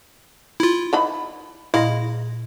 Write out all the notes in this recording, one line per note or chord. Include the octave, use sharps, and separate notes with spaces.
E4 F4
D#3 E3 B5
A#2 G#3 E4 F5 A#6